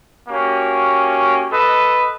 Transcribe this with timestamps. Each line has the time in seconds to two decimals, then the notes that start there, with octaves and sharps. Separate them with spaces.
0.29 A#3 C#4 F#4 G4
1.51 A4 B4 D#5 D#6